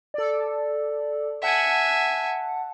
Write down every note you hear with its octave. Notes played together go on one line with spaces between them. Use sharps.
A4 D5
E5 F#5 G#5 A5